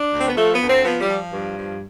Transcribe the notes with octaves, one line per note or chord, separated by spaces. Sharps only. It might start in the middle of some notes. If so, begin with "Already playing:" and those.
Already playing: D4
D2
C4
B3
F3 A3
B3
D2
C4
F3 B3
G3
F3
G2
F3